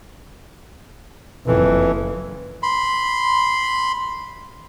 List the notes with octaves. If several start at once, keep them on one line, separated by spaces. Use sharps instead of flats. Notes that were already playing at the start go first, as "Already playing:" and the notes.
F#1 F2 E3
B5 C6